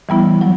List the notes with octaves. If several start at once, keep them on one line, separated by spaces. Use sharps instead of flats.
E3 G3 B3 E4
F#3